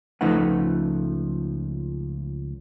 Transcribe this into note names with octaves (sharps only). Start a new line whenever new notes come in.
C#2 F3 A3 D#4 B4 F#5